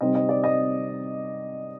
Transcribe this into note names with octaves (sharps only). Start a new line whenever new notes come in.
C3 G3 C4 D#4 D#5
D#5
D5
D#5